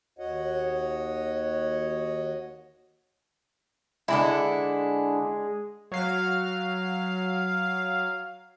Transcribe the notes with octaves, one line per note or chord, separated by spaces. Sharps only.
D#2 F#4 C#5 D#5 F#5
D3 G#3 D4 E4
F#3 F5